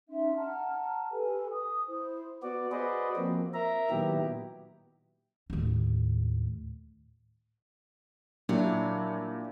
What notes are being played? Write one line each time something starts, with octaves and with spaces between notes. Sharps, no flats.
C#4 D#4 E5 C6
F#5 A5 A#5 F6
G4 A4 B4 G#5
D#6
E4 C5
B3 F#4 D5
F#4 G#4 B4 C5 D5 D#5
F3 A#3 C4
A#4 E5 A#5
A#2 D#3 F#3 B3 E4 G4
D#2 A2
A#2 F#3 D4 E4 G4